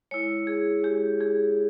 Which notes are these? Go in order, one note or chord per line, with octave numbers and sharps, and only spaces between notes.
G#3 E4 C#5
G#4
G#3 E4 G4
G#4